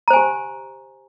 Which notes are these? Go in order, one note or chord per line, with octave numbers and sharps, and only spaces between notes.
G4 C5 G#5 A#5